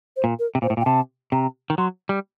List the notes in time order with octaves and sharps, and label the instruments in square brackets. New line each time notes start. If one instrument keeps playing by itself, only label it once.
[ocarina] C5
[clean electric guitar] A#2
[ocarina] A#4
[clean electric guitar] C3
[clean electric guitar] A#2 [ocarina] C5
[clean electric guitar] A2
A#2
[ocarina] G5
[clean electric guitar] C3 [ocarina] A5
[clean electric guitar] C3 [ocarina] A#5
[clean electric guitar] D#3
[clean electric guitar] F#3 [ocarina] C6
[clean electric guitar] G3